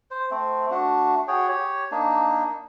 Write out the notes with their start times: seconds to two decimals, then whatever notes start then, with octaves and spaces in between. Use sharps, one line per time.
0.11 C5
0.31 A3 C4
0.71 A3 D4 F#4
1.28 F#4 G#4 C#5 G5
1.49 G4 C#5
1.91 A#3 D4 D#4